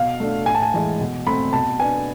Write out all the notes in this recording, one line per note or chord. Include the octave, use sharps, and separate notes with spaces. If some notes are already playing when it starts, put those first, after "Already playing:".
Already playing: B2 F5
A3 D4
A2 G#5
A5
G#5
E3 G#3
B2
A3 C4 B5
B2 A5
B3 D4 G#5